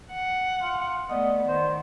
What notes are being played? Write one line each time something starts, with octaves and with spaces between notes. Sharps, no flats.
F#5
F4
A3 B3 D5 D#5 F#5
D#3 C5